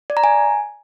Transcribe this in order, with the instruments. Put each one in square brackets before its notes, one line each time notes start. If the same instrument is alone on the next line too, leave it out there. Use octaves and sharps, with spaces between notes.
[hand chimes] D5
A#5
G#5